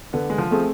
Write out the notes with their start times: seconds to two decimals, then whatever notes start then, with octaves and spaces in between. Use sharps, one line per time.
0.13 D3 B3
0.30 G#3
0.38 F3
0.51 A3 C4 G#4